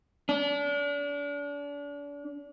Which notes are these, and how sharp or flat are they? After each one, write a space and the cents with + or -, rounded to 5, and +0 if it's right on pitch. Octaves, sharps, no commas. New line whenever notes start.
D4 -35